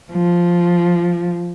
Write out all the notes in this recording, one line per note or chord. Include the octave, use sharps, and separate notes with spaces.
F3